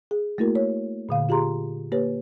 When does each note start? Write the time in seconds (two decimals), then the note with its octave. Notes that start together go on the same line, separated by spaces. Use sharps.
0.11 G#4
0.38 A3 A#3 E4 F#4 A#4
0.55 C#5
1.09 A#2 D3 F5
1.29 F4 G4 G#4 A#5 C6
1.92 A#3 G4 B4 C#5